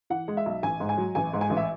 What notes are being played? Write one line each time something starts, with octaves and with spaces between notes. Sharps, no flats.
E3 F#5
G#3
E5
B1
A1 G#5
G#2
G#5
F#3
A1 G#5
G#2
G#5
A1
E5